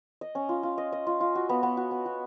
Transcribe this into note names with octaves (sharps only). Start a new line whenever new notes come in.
D#5
C#4
F4
F4
D#5
D#5
F4
F4
F#4
B3
B3
F#4
B3
F#4